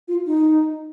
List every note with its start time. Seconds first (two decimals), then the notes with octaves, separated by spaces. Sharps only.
0.08 F4
0.26 D#4